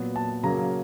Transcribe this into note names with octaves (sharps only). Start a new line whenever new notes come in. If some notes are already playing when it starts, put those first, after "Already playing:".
Already playing: A#2 F#3 B3
A5
C#3 F#3 A#3 A#5